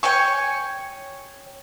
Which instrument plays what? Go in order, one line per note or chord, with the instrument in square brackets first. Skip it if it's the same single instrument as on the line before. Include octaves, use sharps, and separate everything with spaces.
[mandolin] C#5 G5 G#5 C#6